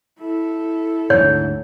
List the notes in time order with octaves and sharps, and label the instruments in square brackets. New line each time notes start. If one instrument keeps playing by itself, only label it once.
[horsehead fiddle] E4 A4
[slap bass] D2 G#2 [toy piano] C#5